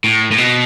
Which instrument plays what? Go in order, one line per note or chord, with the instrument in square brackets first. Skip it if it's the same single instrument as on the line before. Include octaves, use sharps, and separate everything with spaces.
[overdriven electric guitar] A2
A2
B2